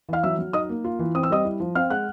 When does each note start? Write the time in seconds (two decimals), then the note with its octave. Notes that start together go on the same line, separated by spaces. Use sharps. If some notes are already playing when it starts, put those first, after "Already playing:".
0.09 E3 F5 F6
0.23 F#3 E5 E6
0.39 F#3
0.53 D#4 D#5 D#6
0.69 A#3
0.84 F4
0.99 E3
1.15 C4 D#6
1.23 E6
1.30 G3 D#5 D#6
1.45 E4
1.60 F3
1.75 C4 F5 F6
1.90 G#3 F#5 F#6